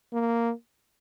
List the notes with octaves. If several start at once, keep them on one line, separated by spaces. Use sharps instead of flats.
A#3